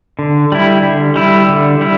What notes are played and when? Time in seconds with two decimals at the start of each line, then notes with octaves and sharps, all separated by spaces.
0.19 D3
0.52 G3 E4
0.83 D3
1.16 G3 E4
1.49 D3
1.81 G3 E4